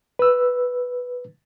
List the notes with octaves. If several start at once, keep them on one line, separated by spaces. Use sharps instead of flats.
B4 E6